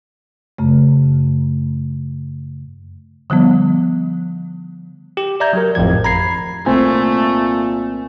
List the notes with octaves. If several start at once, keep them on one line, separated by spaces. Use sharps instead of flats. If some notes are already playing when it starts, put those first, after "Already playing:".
F#2 C#3 A3
D3 F3 G3 B3
G4
D5 E5 A#5 G6 G#6
F#3 G4 A#4
G#1 F2 A2 F3 G#6
A#5 B5 G#6 C7
C2 A#2 A3 C4 G#5